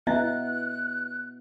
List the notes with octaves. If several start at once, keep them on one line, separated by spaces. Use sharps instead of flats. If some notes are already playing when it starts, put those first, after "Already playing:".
B3 E4 D#5 E5 F#6